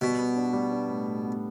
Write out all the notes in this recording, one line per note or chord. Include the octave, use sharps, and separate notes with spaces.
B2 G3
B3
D4
G3
D4
A2
A2
B3